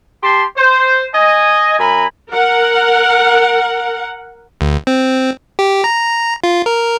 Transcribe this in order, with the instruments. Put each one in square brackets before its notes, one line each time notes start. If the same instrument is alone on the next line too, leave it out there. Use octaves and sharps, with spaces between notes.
[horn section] G4 A5 C6
C5
D#5 G#5
F#2 G#5 A#5 B5
[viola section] A#4 F#5
[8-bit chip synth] D2
C4
G4
A#5
F4
A#4